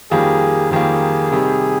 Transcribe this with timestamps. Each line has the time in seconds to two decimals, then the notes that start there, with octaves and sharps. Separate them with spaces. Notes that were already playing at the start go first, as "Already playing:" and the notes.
0.11 F2 D#3 G3 A#3 G#4
0.71 F2 D#3 G3 A#3 G#4
1.32 C3 D#3 G3